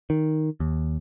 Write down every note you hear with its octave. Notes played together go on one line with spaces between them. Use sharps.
D#3
D#2